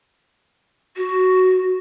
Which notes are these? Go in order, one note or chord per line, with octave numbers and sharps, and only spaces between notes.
F#4